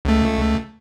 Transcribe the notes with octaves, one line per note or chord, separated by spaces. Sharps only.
C#2 A3